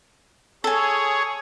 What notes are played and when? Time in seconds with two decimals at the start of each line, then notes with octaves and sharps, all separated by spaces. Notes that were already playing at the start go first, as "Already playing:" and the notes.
0.64 G#4 A4 C#5 G#5